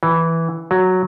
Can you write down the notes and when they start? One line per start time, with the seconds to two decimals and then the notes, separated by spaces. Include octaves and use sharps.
0.03 E3
0.71 F#3